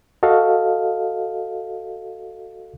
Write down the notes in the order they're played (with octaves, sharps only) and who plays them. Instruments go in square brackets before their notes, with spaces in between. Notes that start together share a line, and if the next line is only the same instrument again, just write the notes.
[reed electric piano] F#4 A4 D#5 F5